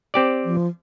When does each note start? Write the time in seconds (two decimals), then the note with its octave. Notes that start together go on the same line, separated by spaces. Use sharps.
0.14 C4 G4 D5
0.45 F3